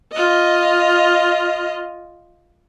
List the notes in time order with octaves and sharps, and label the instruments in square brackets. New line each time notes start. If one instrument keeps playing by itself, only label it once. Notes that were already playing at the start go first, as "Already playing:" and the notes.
[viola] F4 D#5